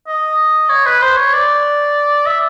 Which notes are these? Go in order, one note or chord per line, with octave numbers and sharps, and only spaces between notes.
D#5
C#5
B4
C5
C#5
D5
E5